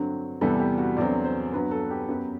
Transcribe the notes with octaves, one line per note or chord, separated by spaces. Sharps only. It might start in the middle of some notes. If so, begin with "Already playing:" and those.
Already playing: G2 D3 F#3 C4
E2 C3 E3 G3 B3 A4
G4
F#4
E2 D3 F#3 C4 D5
C5
G2 F#3 B3 B4
A4
G4
F#2 F#3 B3